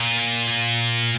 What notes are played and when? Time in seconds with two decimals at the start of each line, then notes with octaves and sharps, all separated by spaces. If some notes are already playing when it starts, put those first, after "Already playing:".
Already playing: A#2